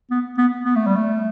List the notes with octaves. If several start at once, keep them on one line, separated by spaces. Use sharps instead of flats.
B3
B3
B3
A3
G3
A3